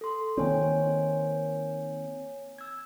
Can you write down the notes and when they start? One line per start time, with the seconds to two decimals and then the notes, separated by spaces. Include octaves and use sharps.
0.01 A4 C6
0.37 D#3 A#3 C4 C#5 G#5
2.58 E6 G#6